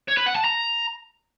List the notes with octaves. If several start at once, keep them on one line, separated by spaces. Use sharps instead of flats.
C#5
B4
F#5
A5
A#5